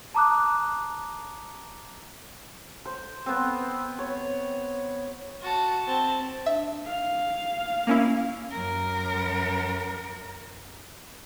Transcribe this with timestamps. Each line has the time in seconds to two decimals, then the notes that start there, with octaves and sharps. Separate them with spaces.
0.14 A5 A#5 D6 D#6 F#6
2.85 C5
3.26 B3 C4
3.99 C#5
5.42 F#4 A5
5.87 C4 A5
6.46 D4 E5
6.86 F5
7.87 A#3 C#4 E4
8.51 F#2 A#4